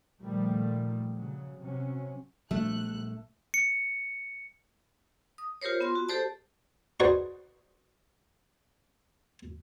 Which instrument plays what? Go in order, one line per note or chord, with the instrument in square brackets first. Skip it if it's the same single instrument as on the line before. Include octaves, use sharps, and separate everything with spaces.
[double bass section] A#2 D#3 F3 G3 A3
C#3 F#3
C3 F#3 C#4
[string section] A#1 F#6 [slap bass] F#3 G3 B3 [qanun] A3
[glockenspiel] C#7
[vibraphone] D#6
F4 G4 A#4 C5 C#5
B3 F4 C6
F#4
G4 A4 C5 D5 A5
[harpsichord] D#4 F#4 G#4 B4 C5 D5